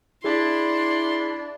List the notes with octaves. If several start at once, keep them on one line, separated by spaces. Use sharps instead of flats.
D4 E4 G#4 C6